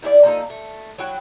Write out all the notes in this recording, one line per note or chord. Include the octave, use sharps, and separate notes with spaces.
D#3 E4 G#4 D5
F3 A#3 D#4 A4
A3
F#3 E4 F#4 G5